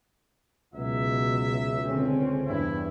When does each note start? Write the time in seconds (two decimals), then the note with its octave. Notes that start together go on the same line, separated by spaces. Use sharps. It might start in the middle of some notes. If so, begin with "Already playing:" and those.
0.75 C#2 B2 F#3 E5
1.84 D3 C4 C#4
2.47 E2 G2 E4